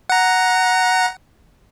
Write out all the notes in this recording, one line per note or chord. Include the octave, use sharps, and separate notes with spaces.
F#5 A#5